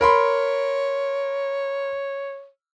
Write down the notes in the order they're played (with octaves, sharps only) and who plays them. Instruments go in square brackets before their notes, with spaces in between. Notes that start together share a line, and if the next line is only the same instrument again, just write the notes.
[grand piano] A#4 B5 C6 [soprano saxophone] C#5